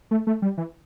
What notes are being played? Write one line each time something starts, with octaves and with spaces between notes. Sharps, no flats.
A3
A3
G3
E3